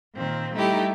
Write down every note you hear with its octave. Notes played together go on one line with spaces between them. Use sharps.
A#2 D#3 C4
G3 A3 D#4 E4 G4